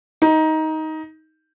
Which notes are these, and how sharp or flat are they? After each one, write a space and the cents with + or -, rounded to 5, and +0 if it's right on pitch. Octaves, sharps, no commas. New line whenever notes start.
D#4 +15